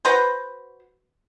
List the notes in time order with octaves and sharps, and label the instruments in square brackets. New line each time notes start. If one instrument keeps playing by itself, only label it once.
[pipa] F#4 B4 C5